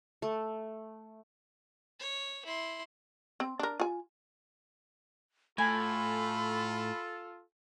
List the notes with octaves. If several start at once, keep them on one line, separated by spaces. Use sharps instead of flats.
A3
C#5
E4 C6
C4
D4 A#4
F4 G#5
A2 F4 A4 G#5 B5